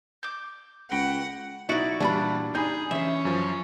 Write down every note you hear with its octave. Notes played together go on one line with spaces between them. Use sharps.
D6 G6
C#2 F#4 F#5 G5 B5
B1 D#4 E4 F#4 D5
A#2 E3 G3 D4 G#5 B5
G3 D#4 G#4 B5 G6
E3 C#4 E5 C6
F#2 F3